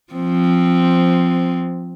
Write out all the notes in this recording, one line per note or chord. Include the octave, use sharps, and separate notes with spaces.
F3 C4